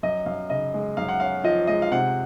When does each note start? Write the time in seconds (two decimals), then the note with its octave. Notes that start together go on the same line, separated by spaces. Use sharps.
0.03 F#2 D#5
0.26 F#2 F5
0.50 C#3 D#5
0.74 G#3
0.97 F#2 F5
1.09 F#5
1.20 C#4 F5
1.44 F3 D#5
1.67 G#3 D#5
1.82 F5
1.92 C3 F#5